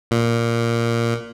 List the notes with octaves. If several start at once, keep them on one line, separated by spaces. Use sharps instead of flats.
A#2